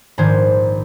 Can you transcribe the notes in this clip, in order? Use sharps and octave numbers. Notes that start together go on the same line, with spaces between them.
A#1 G#2 D#3 C5 G#6